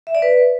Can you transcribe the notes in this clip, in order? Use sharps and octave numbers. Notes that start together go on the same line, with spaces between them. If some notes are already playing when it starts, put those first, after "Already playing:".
E5
D5
B4